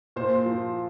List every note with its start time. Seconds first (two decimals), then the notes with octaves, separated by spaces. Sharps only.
0.16 A#2 C5
0.46 F3